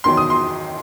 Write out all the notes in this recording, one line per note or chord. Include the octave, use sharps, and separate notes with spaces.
E2 D#3 F#3 C6
D#6
C6